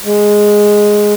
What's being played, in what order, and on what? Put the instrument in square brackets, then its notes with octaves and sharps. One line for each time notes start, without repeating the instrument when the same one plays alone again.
[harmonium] G#3